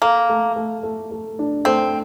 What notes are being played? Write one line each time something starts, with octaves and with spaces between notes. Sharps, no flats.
A#3 A4
A3
A3
A3
A3
D4
A3 C4